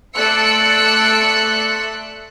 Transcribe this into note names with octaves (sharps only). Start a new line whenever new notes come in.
A3 D5 C6 E6 F#6 C#7